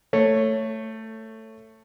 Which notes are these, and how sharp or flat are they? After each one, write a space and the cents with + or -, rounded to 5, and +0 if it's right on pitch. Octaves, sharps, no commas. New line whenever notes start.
A3 +15 C#5 -5